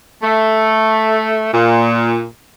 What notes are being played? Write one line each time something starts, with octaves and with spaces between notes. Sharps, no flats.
A3
A#2